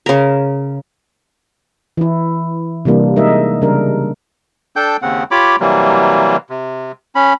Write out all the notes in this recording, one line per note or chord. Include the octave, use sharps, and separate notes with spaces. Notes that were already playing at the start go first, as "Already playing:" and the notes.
C#3 A#4
E3 E4
C3 E3 G3 A#3 D4
G#3 D#4 A#4 D#5 E5
C#3 G3 D4 A#4
D4 A4 G5 G6
D#2 C#3 C4 F#5
F4 G4 C#5 B5 D6
C3 E3 F#3 G3 A#3
C3
C#4 B5